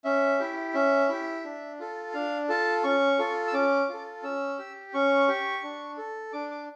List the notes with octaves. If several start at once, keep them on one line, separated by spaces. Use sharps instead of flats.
C#4 E5
E4 G4
C#4 E5
E4 G4
D4
F4 A4
D4 F5
F4 A4 A5
C#4 C#6
F4 A4
E6
C#4 D6
F4 A4
C#4 E6
G4
C#4 C#6
G4
D4
A4
D4 D6
D6